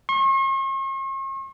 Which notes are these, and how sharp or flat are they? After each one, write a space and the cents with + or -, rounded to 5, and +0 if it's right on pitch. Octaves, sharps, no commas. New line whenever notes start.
C#6 -45